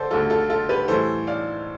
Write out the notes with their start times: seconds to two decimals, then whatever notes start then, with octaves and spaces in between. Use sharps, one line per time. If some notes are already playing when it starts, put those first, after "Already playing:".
Already playing: D3 A4 C5 D5
0.11 D2 D3 G3 F4 A4
0.30 F4 A4
0.50 F4 A4
0.69 G4 B4
0.88 A2 E3 G3 A4 C5
1.27 D5 F5